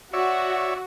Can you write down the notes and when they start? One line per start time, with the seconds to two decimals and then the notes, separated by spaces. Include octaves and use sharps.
0.13 F#4 C#5 D5 E5